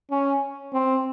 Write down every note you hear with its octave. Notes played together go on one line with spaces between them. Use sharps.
C#4
C4